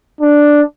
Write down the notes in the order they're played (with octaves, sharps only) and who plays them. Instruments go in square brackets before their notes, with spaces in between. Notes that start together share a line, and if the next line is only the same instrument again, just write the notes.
[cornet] D4